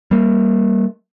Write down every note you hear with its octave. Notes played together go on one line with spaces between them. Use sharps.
G3 A#3